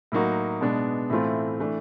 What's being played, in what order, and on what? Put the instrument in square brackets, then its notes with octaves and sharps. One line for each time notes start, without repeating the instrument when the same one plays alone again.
[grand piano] A2 F#3 A#3 D#4 F#4
B2 G#3 B3 D4
A2 E3 A3 C4 F4
E3 A3 D4